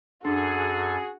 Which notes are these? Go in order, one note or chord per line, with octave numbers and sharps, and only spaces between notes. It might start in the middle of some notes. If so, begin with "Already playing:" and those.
F#2 D4 F#4 G#4 A4